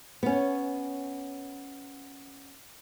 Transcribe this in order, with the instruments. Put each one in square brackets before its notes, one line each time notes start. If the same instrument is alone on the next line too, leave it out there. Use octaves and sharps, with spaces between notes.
[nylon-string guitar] B3 C#4